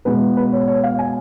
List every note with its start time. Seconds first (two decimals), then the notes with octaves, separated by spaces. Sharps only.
0.05 B2 G#3 B3 B4
0.37 B4
0.53 C#5
0.67 C#5
0.83 F5
0.99 G#5